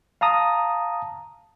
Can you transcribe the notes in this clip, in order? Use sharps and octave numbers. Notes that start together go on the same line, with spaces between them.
F5 A5 A#5 D#6